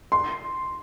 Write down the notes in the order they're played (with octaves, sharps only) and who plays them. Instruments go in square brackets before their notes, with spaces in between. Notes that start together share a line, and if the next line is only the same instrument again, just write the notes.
[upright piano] C6